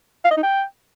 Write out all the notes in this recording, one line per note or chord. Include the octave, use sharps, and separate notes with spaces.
F5
D#5
D#4
G5